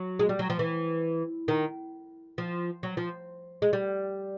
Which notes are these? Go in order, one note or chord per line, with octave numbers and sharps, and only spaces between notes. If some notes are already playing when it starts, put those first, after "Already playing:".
Already playing: F#3
G#3
G3
F#3
F3
E3
D#3
F3
F#3
F3
G#3
G3